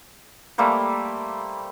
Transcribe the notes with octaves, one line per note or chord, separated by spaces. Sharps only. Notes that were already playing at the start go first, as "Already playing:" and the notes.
G3 A3 A#3 C5